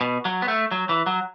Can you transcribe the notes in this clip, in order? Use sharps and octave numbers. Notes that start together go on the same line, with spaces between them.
B2
F#3
B3
A3
F#3
E3
F#3